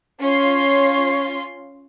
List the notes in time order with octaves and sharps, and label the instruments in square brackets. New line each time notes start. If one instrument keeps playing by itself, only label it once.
[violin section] C#4 F4 C6 [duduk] C#5